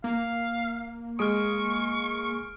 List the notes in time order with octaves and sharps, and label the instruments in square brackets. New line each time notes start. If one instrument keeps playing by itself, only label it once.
[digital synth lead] A#3 [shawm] F5
[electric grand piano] G#3 D#6 [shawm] C#6 [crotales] F6 D7